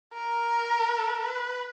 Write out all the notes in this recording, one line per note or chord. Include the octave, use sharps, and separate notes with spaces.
A#4
B4